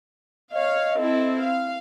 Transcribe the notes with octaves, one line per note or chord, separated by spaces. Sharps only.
C#5 D#5 F5
C4 E4 A4
F5